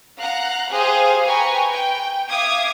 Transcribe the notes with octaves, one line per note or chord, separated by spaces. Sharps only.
F5 F#5 A#5 F#6
G4 G#4 C5 F5 D#6
B4 G5 G#5 A#5 C#6
G5
E5 F5 D6 D#6 G#6